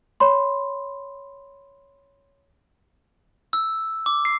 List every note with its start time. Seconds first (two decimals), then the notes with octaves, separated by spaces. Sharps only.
0.20 C#5 B5 C6
3.53 E6
4.06 D6
4.25 C7